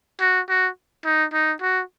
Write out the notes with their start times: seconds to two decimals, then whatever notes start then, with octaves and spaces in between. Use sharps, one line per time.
0.20 F#4
0.49 F#4
1.05 D#4
1.33 D#4
1.61 F#4